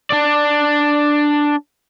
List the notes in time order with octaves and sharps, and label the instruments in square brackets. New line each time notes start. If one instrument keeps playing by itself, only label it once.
[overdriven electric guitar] D4 D5